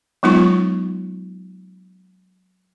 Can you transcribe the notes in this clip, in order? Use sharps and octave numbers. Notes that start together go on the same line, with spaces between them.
F#3 G#3 B3 D#4 F4 C#6